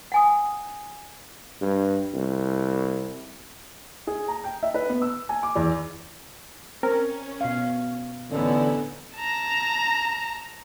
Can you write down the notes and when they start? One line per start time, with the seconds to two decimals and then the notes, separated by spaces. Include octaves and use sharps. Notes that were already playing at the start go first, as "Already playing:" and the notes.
0.12 F#5 G#5 D#6
1.61 G2
2.14 C2
4.07 G#4
4.28 A#5
4.44 G5
4.63 E5
4.74 B4
4.89 B3
5.02 E6
5.29 G#5
5.43 D6
5.56 E2
6.83 C4 C#4 A#4
7.41 B2 F5
8.32 A1 D3 B3 C#4 D#4 E4 A4
9.16 A5 A#5